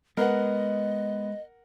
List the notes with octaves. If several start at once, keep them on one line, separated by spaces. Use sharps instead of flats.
G#3 B3 A#4 D#5 F#5